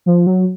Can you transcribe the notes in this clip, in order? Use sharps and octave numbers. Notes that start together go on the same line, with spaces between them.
F3
F#3